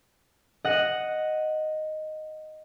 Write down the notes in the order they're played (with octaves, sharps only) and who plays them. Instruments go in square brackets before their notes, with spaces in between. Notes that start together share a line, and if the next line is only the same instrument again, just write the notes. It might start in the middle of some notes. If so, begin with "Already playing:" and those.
[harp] D#5 F#5